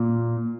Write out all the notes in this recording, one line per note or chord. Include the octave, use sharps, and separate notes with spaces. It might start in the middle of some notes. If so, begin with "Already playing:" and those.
Already playing: A#2